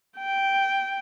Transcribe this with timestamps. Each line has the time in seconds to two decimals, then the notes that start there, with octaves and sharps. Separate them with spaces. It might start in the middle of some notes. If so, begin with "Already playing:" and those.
0.18 G5